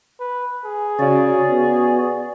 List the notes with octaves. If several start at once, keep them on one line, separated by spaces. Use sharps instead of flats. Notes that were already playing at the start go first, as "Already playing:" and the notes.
B4
G#4
C#3 F#4 D5
B3